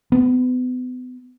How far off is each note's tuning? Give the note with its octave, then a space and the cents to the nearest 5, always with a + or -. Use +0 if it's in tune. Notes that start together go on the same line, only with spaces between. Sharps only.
B3 +35